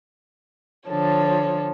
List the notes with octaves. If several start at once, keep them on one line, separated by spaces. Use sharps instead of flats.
D3 F3 A4 C#5